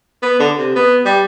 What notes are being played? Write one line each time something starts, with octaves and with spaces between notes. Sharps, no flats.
B3
D3
C3
B3
G3